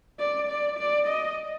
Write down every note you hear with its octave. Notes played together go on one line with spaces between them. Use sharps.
D5
D5
D5
D#5